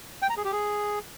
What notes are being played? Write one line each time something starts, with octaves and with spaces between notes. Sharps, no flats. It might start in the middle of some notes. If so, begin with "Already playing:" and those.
G5
A#5
G#4
G4
G#4